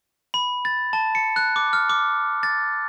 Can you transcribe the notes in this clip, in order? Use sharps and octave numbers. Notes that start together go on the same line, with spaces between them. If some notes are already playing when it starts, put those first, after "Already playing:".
B5
A6
A5
C#7
F#6
D6
F6
D6
A6